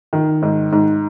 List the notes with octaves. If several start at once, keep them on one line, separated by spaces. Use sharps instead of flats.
D#3
G#2
G#2